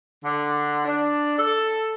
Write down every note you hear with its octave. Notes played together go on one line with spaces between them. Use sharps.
D3
D4
A4